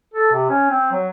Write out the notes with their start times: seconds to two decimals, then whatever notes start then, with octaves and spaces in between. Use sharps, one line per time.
0.14 A4
0.33 C3
0.49 C#4
0.70 C4
0.92 F#3